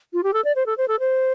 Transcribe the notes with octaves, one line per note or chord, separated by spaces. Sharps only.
F4
G4
A4
D5
C5
A4
C5
A4
C5